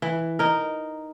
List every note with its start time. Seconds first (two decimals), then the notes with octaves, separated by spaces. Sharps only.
0.02 E3
0.39 D#4 A#4